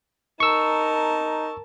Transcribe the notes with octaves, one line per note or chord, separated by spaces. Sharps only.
D#4 A#4 A5 C#6 E6